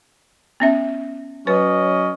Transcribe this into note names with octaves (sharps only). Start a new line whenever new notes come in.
B3 C#4 E5
F#3 C#4 B4 D#5